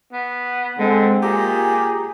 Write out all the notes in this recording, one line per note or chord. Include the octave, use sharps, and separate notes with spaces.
B3
D3 G#3 C4
A#2 G4 G#4 A#5